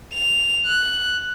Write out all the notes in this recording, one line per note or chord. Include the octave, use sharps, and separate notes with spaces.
F7
F#6